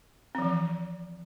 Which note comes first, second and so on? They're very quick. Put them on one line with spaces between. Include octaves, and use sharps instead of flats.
C4 F3 E3